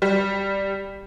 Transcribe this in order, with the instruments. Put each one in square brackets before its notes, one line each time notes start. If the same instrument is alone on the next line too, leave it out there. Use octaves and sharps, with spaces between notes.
[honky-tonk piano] G3